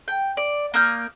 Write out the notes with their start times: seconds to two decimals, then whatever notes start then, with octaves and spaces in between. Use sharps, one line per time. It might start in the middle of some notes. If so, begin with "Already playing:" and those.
0.08 G5
0.37 D5
0.74 A#3 D#6 F6 G6